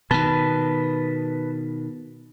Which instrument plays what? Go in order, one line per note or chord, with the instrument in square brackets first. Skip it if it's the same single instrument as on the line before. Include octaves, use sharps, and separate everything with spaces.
[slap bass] B2 D#3 [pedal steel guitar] B4 A5